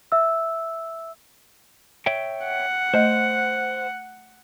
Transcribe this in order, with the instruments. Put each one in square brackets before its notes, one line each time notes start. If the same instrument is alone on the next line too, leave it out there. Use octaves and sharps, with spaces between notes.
[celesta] E5 E6
[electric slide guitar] C#5 E5 G5
[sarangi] F#5
[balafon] A3 D#5 [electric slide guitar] C5